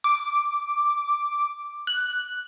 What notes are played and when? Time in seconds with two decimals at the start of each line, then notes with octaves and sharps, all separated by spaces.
0.04 D6
1.87 F#6